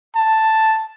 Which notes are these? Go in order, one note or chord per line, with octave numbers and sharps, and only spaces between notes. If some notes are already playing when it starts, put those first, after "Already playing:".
A5